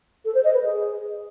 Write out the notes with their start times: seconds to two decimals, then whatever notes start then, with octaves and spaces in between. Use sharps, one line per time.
0.25 A4
0.34 C5
0.44 D#5
0.53 B4
0.63 G#4